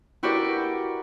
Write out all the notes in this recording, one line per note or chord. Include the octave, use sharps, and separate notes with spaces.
E4 F#4 G4 A#4 B4 D5